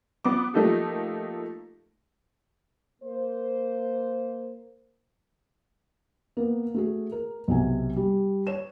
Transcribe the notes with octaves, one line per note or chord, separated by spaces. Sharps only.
B3 D6
F3 A3 A#3 D#4 G4 A4
A#3 C5
A#3 B3
A3 F#4 G#4
A#4
B1 C3 G#5
G3
C#5 E7